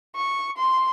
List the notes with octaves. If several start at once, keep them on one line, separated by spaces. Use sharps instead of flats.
C#6
C6